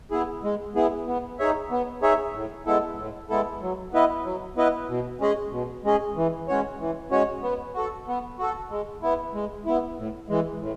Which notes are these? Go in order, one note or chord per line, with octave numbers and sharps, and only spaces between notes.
B3 E4 G#4
G#3
B3 E4 G#4
B3
D#4 G#4 C#5 E5
B3
D#4 G#4 C#5 E5
A2
G#3 B3 E4 A4
A2
G#3 B3 E4 A4
F#3
B3 E4 B4 D#5
F#3
B3 E4 B4 D#5
B2
G#3 C#4 G#4 D#5
B2
G#3 C#4 G#4 D#5
E3
G#3 C#4 F#4 C#5
E3
G#3 C#4 F#4 C#5
B3
F#4 A4
B3
F#4 A4
G#3
B3 E4
G#3
B3 E4
A2
E3 G#3
A2